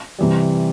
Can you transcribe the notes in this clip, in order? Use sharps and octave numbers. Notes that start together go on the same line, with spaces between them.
C3 E3 G3